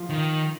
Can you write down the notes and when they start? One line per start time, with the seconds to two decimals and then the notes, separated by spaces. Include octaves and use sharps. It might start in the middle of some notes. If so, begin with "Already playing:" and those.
Already playing: F3
0.10 D#3